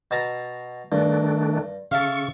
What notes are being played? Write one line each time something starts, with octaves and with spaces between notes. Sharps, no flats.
B2 A5 A#5
G2 D#3 A3 D4
C#3 A4 E5 F5 C#6